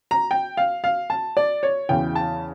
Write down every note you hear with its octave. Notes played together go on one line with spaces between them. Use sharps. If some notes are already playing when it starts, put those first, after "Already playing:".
A#5
G5
F5
F5
A5
D5
C#5
E2 C#3 E3 G5
A5